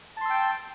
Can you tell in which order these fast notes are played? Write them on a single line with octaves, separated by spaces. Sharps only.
A5 C6 E6 G5